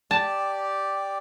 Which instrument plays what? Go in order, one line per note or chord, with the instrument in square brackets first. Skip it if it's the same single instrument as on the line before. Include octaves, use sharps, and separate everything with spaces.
[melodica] G4 D5 [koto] A5